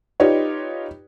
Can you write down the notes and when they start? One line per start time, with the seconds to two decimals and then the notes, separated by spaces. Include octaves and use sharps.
0.20 D#4 F4 G4 B4 C#5 D5